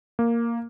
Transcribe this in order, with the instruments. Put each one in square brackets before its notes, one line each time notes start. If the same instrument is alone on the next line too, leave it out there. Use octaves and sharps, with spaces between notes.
[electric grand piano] A#3